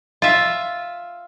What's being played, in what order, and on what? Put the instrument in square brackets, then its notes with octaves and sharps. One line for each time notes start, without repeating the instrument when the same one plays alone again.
[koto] F4 E5